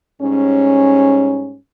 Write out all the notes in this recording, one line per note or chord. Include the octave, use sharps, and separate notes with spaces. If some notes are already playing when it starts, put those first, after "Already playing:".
G#2 G3 C#4